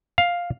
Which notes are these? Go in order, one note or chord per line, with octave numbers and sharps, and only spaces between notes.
F5